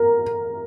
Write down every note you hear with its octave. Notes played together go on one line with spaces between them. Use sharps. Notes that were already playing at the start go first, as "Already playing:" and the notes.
Already playing: A#4